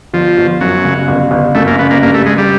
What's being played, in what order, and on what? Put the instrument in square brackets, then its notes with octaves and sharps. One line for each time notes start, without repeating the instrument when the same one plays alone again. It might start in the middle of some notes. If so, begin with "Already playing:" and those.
[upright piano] G1 [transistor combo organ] F3
[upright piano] G1
[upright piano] F#2 [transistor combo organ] F#3
[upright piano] C#3
G1
G1
[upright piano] F#2 [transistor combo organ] A3
[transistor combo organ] A#3
[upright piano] C#3 [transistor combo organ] B3
[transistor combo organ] A#3
[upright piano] G2 [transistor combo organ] A#3
[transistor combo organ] A3
[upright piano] G2 [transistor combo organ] G#3
[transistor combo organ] G3